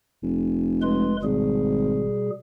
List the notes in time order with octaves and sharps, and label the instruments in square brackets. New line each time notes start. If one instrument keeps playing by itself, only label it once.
[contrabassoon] F1
[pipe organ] G#3 B4 C6
[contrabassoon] G#1 [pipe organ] B2 G3 G#4